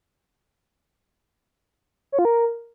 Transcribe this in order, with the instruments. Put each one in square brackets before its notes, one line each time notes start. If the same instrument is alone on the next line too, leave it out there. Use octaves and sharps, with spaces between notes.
[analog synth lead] C#5
F4
A#4